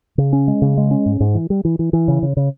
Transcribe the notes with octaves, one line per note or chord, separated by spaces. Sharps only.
C#3
C#4
G#3
C#3
G#3
C#4
G#2
G#2
E3
G3
E3
E3
E3
C#3
C#3
C#3